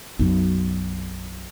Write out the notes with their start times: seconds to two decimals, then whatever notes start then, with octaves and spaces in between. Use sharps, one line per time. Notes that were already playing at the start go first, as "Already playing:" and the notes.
0.19 B1 F#2